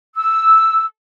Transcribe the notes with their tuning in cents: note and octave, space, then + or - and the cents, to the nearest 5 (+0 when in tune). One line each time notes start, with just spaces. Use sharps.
E6 -5